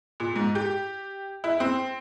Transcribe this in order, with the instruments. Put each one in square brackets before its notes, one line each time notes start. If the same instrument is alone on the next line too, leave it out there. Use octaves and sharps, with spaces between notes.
[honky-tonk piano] A#2
G#2
G4
E4
C4